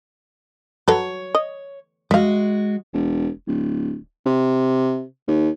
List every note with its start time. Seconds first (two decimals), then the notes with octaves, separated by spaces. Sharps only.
0.88 F#3 A4 B4 C#5
1.35 D#5
2.11 G#3 F#4 E5 F5
2.93 E1
3.47 D1
4.26 C3
5.28 D#2